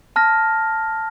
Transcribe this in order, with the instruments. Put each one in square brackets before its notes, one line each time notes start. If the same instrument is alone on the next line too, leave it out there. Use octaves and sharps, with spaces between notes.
[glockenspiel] A5 F6 A#6